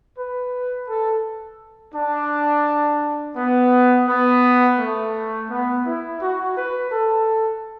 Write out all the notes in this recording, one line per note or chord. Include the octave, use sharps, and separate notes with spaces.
B4
A4
D4
B3
B3
A3
B3
E4
F#4
B4
A4